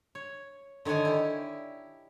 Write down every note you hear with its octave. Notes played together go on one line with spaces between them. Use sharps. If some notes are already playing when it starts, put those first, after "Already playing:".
C#5
D3 D#3 C#5 F#5 G#5
E4 G4